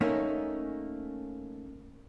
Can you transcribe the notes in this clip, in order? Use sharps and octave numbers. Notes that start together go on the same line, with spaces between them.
A3 A#3 C#4 D#4